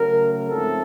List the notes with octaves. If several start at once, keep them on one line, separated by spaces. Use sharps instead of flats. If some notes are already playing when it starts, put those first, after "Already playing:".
Already playing: C#3 F#3 A3 A#4
G#2 F3 A3 C4 A4